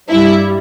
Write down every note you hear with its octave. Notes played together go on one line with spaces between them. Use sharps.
G2 G3 E4